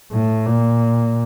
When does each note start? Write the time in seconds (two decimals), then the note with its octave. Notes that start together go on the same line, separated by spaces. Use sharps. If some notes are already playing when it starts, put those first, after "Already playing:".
0.12 A2
0.47 A#2